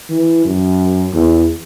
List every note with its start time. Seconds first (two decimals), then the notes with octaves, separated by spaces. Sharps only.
0.10 E3
0.45 F#2
1.13 E2